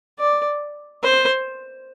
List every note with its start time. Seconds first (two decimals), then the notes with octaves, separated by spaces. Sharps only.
0.19 D5
1.03 C5